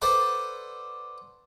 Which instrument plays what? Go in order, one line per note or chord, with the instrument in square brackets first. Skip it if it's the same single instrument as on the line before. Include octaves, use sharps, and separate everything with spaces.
[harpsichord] A4 B4 C5 D5 F#5